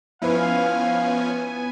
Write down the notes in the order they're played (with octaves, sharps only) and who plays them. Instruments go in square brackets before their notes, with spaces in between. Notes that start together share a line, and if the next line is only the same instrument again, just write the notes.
[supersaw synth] F3 C#4 [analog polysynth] B3 G#5 [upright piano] E4 B4 [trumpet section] F5